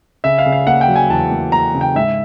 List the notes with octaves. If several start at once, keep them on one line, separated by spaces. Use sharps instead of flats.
C#3 E5
F5
C#3
F5
A#3 F#5
G5
F#3
G#5
E2 A5
A#3
A#3 A#5
C#3
G5
G#2 E5